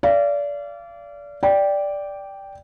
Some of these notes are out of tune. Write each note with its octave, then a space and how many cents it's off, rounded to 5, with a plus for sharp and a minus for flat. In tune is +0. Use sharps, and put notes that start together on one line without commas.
D5 -25 F5 -35
D5 -5 G5 +0